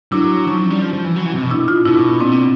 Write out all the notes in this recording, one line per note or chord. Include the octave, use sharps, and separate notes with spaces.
F#3 D4 E4
F3 C#4 D#4
F#3
G3
F3
F3
E3
F#3
E3
C3
B2
D4 E4
D#4 F4
B2 D4 E4
A#2 C4 D4
B2